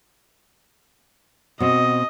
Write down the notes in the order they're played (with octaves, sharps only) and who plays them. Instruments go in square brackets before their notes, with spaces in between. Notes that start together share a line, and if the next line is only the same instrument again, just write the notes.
[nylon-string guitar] B2 C4 [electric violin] D#5